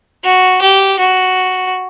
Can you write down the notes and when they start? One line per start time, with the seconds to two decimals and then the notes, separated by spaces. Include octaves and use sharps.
0.24 F#4
0.61 G4
0.99 F#4